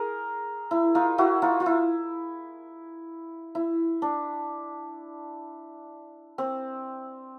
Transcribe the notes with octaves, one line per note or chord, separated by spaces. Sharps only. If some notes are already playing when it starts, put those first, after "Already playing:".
Already playing: G#4 A#4
E4
D#4 F4
E4 F#4
D#4 F4
F4
E4
E4
D4
C4